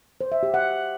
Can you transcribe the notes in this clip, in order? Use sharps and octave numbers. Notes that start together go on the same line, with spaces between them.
C5
E5
G4
F#5